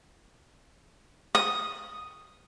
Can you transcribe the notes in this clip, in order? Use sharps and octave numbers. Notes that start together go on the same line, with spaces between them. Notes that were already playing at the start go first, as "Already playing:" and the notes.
D#6